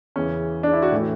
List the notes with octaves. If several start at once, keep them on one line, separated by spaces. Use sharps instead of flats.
E2 C#3 E3 C#4
D4
E4
F#4
A2 E3